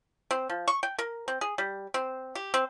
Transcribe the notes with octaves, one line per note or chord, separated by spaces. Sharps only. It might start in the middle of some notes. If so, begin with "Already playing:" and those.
C4
F3
C#6
G5
A#4
C4
G#4
G3
C4
G4
C4